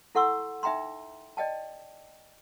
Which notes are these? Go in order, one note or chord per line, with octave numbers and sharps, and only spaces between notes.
E4 A4 F#5 C6 C#6 E6
D#4 E5 G5 A#5 C6
D5 D#5 G5 A5